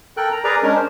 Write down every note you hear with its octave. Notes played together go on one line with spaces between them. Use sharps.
A4 A#4 G5 F#6
A#5
G#4 A#4 B4 D5 A#5
G#3 C#4 D4 A#4
C5